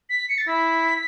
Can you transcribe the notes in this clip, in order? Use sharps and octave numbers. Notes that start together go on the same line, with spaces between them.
B6
C#7
A6
E4 B6